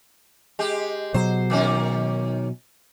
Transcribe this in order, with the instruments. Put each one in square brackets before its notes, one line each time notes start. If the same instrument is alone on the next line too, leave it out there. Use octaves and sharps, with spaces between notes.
[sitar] G#3 G4
[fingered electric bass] B2 F#3 [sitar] C5
[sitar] D#3 A#3 C#4